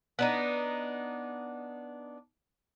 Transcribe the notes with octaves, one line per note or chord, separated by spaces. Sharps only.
B3 D4 D#4